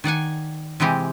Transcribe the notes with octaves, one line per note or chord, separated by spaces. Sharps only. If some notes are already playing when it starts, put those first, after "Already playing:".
D#3 D5 F#5 G#5
C3 E3 G#3 C4 G4